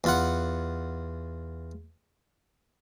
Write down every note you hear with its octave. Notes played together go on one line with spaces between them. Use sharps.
E2 F4 F#5